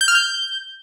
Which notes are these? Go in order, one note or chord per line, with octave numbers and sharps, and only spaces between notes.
G6
F6
G6